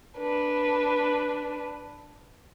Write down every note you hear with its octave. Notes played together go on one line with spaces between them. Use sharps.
D4 B4